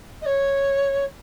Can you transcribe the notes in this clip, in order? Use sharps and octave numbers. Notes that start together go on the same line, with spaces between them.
D#5
C#5